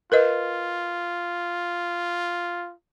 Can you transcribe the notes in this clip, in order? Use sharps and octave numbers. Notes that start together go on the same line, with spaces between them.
F4 A#4 B4 D#5